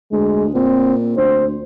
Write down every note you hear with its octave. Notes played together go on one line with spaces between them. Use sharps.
D2 G#3
A#2 C4
D2 C5